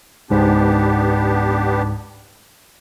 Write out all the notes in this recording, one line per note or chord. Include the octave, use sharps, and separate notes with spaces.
C#2 G#2 B3 D4 G4